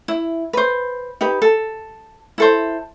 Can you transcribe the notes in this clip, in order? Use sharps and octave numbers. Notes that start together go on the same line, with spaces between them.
E4
B4 C5
D#4 G4 B4
A4
E4 A4 C5